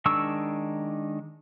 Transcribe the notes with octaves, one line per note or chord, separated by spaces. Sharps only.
D#3 G#3 D4 C#6 E6